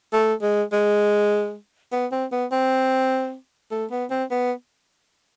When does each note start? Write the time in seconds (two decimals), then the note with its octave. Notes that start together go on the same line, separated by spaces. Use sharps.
0.13 A3
0.42 G#3
0.72 G#3
1.92 B3
2.12 C4
2.32 B3
2.51 C4
3.71 A3
3.91 B3
4.10 C4
4.31 B3